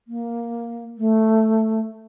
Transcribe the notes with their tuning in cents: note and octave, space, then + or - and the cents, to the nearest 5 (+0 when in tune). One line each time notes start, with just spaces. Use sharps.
A#3 +5
A3 +5